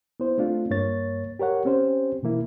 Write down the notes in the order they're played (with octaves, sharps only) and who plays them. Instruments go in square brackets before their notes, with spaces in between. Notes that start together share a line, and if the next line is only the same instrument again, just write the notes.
[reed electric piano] B3 E4 C5
A3 C4 D4 F4
G2 A#3 C#5 A6
G4 A#4 C#5 F#5
C4 C#4 G4 C5
B2 E3 A#3 E4